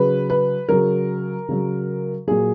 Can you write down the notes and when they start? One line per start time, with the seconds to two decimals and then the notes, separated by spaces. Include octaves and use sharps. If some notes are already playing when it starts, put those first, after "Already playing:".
Already playing: C#3 F#3 B4
0.30 B4
0.69 C#3 F#3 A#4
1.49 C#3 F#3
2.27 A#2 F#3 G#4